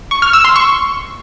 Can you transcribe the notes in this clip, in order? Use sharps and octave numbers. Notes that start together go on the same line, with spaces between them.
C#6
F6
E6
C6
C#6